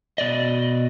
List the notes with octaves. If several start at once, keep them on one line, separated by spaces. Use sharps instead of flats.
B2 D5 D#5